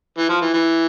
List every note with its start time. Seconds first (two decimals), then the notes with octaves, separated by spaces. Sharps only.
0.18 E3
0.29 F3
0.41 E3
0.54 E3